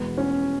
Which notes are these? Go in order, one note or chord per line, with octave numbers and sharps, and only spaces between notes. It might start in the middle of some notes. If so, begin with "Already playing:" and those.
Already playing: E2 B2 G#3 B3
C#4